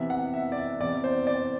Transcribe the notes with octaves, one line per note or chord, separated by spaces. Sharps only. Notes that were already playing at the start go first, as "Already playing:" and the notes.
Already playing: C3 E3 B3 E5
F#5
E5
D5
E5
C3 E3 B3 D5
C5
D5